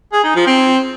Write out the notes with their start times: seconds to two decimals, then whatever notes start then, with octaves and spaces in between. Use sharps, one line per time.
0.12 G#4
0.24 D#4
0.35 F3
0.47 C4